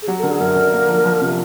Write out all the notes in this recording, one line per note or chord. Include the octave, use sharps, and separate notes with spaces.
G#4
F#3 G4
A4
D3 A#4
G#4
F#2 A#4
D3
A#3
F3
F3
C3